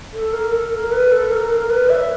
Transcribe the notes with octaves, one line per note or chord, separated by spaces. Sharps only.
A4
A#4
A4
A#4
B4
A4
A#4
A#4
B4
E5